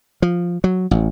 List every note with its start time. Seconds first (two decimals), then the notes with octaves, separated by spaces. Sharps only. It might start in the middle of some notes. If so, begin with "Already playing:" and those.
0.22 F3
0.64 F#3
0.91 A1